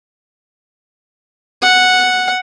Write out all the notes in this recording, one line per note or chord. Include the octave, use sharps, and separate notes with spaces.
F#5